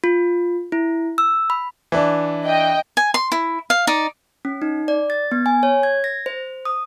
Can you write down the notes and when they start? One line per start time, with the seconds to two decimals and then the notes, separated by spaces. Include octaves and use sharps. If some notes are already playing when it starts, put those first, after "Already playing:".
0.04 F4
0.72 E4
1.18 E6
1.50 B5
1.92 E3 D4
2.46 D#5 G5
2.97 G#5
3.14 C6
3.32 E4
3.70 F5
3.87 D#4 D5
4.45 C#4
4.62 D#4
4.88 D5
5.10 A6
5.32 B3
5.46 G#5
5.63 C#5
5.83 G#6
6.04 A#6
6.26 C5
6.65 D#6